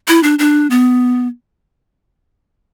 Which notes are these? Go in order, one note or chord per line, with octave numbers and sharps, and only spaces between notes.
E4
D4
D4
B3